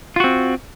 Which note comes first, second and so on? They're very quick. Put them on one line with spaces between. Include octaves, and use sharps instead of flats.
F4 F#4 C4